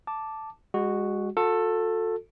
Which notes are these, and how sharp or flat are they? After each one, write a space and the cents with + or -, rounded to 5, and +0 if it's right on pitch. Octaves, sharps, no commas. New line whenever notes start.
A5 +0 D6 +0
G#3 -30 F#4 +0
F#4 -45 A4 +10